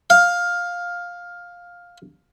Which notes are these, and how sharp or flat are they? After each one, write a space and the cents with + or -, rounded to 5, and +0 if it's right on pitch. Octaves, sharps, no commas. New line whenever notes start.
F5 +10